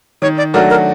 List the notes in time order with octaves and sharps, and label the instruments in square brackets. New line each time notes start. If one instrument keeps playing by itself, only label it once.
[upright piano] D#3 [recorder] C#5
[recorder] D5
[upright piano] F#3 A3 D4 F#4 [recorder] A#4
[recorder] A#4